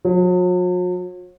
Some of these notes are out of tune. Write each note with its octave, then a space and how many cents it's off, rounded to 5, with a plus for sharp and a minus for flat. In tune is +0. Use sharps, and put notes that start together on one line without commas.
F#3 -45